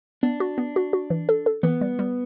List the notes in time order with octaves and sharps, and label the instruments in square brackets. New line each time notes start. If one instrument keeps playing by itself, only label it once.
[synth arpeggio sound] B3 [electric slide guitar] D4
[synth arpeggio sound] F#4
B3
F#4
F#4
E3
A4
A4
[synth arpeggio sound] E3 [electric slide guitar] B3
[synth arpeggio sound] G3
G3